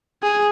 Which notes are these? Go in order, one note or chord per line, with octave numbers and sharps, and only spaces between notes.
G#4